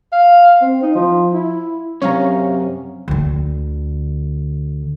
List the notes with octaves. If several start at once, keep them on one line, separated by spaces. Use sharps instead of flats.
F5
C4
D#4
F3
E4
F#2 C3 C#4 C#5 F5 A#5
D2 D3